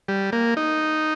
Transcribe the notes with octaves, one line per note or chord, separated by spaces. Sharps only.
G3
A#3
D#4